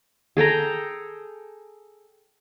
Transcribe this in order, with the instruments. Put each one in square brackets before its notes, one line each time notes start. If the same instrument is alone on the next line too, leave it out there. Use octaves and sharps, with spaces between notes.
[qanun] G#4 A4 G5 A#5